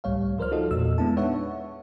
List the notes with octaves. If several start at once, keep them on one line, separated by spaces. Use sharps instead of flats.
C#2 A2 G3 C#5 F5
F3 A#4 C5 D5 F6
D#4 F4 F#4 A4 D#5
E2 A#2 E6
G#3 B3 D4 E4 A5
D#4 B4 C#5 E5 F#5 C#6